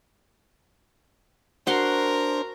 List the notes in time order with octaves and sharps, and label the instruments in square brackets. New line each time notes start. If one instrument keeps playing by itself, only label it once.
[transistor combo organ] D4 C5 [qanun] F#4 F#5 C6 [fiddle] A#4